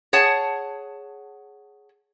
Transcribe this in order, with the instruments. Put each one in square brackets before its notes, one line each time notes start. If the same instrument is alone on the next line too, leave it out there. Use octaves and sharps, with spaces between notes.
[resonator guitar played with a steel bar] G#4 C#5 F#5 A5